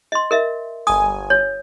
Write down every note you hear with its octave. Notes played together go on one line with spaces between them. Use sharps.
D#5 C6
A#4 D#5 E5
G1 G#5 D#6
C#5